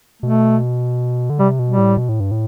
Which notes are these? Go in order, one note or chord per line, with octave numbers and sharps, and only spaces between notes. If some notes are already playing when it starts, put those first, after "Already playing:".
B2 A3
D3
C3 G3
B2
G3
A2
B2
A2
G2
A2